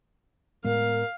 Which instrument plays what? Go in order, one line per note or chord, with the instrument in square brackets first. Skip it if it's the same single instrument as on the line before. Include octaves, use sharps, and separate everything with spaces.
[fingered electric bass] A2 G#3 B3 [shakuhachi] A#4 [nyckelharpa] F5